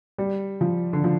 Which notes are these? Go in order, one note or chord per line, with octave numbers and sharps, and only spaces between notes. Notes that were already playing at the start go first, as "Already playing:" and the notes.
G3
F3
D3
F3